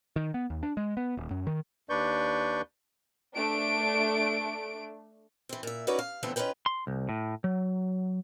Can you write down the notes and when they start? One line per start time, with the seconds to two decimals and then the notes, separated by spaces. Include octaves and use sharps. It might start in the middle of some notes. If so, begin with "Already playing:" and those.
0.16 D#3
0.34 B3
0.50 D#2
0.63 D4
0.77 G#3
0.97 B3
1.17 D#1
1.31 F#2
1.47 D#3
1.89 D#2 D4 B4 D5 C#6 G6
3.35 A3 D4 D7
5.49 E3 C4
5.63 A#2 E5
5.87 C#4 D#4 E4 F#4 B4 D5
5.99 F5
6.23 D3 E3 F3 A3 B3 C4
6.36 C#4 D#4 F4 B4 G5
6.66 C6
6.87 C2
7.09 A2
7.44 F#3